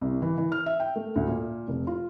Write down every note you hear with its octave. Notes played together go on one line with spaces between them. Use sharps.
C2
E3
E3
F6
E5
G5
A3
D2
A#2
F1
F4